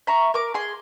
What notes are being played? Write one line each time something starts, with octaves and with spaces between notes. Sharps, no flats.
E5 A#5 C#6
A#4 D6
G#4 C6